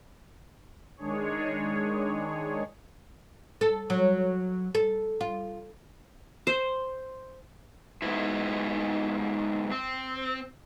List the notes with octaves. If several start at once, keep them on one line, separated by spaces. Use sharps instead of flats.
D#3 G#3 D4 G#4 C#5
A4
F#3
A4
F4
C5
G#2 B2 E4
C4